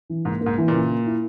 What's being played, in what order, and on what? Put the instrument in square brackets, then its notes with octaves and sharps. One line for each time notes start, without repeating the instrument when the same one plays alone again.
[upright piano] E3
[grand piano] G#2 [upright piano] A#3
[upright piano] A#3
[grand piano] G#2
[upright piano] E3
[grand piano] A#2 [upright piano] C#3
[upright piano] A#3
E4